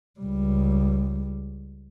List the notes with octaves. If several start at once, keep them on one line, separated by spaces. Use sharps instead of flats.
C#2 G3